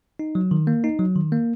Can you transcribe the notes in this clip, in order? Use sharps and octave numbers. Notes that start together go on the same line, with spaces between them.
D#4
F#3
D#3
A#3
D#4
F#3
D#3
A#3